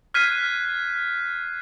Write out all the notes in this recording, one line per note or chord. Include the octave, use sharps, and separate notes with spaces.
F6 F#6 G#6 B6 C7 D#7